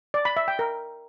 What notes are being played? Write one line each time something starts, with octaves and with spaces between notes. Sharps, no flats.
D5
B5
E5
G5
A#4